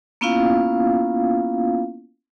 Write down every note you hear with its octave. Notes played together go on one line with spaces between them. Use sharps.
A#3 B3 C#4 E4 F4 F5